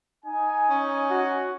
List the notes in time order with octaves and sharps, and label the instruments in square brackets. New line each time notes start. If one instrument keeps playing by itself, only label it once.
[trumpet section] D#4 G#5
[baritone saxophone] C#4
[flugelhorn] F#4